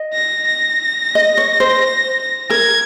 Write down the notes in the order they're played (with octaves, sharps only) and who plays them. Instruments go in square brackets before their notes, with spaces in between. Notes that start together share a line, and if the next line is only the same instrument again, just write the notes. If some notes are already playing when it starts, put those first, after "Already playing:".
Already playing: [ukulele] D#5
[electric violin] A#6
A#6
[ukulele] D#5
C#5
C5
[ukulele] A#4 [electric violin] G#6